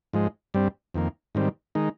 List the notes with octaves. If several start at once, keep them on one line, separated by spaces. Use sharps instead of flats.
G#2 F3 G#3
G2 G3 C4
F2 D#3 A#3
G#2 D#3 G3 C4
D#3 G#3 D#4